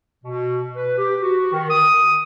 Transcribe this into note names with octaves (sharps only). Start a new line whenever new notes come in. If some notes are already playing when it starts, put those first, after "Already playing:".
B2
B4
G4
F#4
D#3
D#6